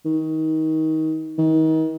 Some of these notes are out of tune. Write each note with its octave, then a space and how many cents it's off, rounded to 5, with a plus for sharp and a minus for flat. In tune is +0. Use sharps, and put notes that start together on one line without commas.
D#3 +25
D#3 +35